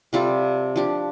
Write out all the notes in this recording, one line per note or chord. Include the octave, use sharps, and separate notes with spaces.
C3 G3 F4 A4
F3 D4 G4